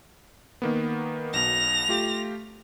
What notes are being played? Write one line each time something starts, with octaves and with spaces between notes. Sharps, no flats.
D#3 A#3 B3
B1 B2 A#6 F7
A3 F4 G4